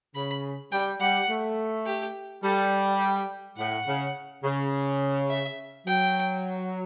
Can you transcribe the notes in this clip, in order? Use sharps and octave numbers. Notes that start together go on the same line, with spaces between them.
C#3 B5
G3 G5
G3 F#5
A3
G4
G3 A4
G5
A2 F#5
C#3
C#3
E5
F#3 G5